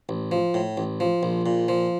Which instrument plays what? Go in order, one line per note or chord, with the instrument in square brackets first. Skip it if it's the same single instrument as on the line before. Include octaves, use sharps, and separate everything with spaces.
[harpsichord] A1
F3
A2
A1
F3
A#1
A#2
F3